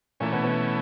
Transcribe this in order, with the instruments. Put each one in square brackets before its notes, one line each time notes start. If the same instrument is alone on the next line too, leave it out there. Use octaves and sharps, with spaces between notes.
[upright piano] A#2 A#3 [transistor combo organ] E3 A3 C#4
[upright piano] B2 B3
B2 B3